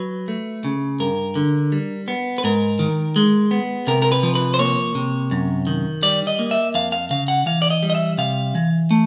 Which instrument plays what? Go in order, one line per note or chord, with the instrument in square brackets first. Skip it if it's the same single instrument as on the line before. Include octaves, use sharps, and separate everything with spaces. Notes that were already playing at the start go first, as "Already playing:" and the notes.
Already playing: [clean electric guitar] F#3 B4
A3
C#3
G2 A#4
D3
G3
B3
B4
G#2 A#4
D#3
G#3
B3
C3 A#4
A#4
B4
F3
B4
C5
A#3 C#5
C3
F#2
D#3
G3 D5
D#5
A#3
E5
F2 F5
F5
C#3 F5
F#5
E3 F5
D5
D#5
G3
D#5
E5
C3 F5
E3
A3